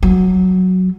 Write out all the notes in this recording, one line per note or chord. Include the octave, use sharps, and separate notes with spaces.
F#3